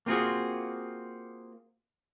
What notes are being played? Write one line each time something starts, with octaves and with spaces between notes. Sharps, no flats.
A#3 C4 F4 F#4 G#4